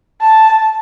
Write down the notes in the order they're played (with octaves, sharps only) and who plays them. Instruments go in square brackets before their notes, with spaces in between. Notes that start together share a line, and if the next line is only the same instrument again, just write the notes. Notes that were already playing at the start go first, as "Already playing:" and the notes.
[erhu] A5